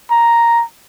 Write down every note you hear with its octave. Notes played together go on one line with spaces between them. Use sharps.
A#5